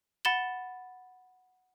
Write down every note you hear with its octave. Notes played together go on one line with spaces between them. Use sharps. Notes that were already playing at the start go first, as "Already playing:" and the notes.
F#5 B5 A6 E7 G7